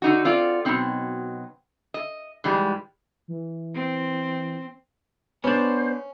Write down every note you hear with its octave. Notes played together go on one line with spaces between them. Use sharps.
D3 D#4 F#4
C4 F4 A4 D5
B2 D#3 F#3 C4 D#4
D#5
G#2 E3 G3 G#3
E3
C4
B3 C#4 D4 C5